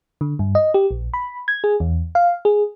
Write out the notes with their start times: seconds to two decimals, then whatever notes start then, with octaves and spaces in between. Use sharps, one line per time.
0.21 D3
0.39 G2
0.55 D#5
0.74 G4
0.91 A#1
1.14 B5
1.48 G#6
1.64 G#4
1.80 E2
2.15 F5
2.45 G#4